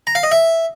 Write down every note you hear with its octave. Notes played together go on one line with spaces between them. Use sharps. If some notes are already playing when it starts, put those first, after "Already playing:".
A#5
F5
D#5
E5